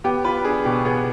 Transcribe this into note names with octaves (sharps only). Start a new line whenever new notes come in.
B3 G4
F4 B4
D4 G#4
B2 G4
B3 G#4